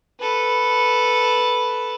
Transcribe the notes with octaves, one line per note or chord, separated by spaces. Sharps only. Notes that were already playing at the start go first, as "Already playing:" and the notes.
A4 B4